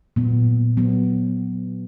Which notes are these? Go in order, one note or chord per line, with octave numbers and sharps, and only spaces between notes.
A#2 F#3 B3
A#2 F#3 B3